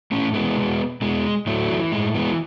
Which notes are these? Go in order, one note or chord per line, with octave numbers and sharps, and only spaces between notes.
A2 A3 C#4
E3 G#3 B3
B2
B2 G#3
A2 F#3 A3
E3
A2 G#3
E3 G#3 B3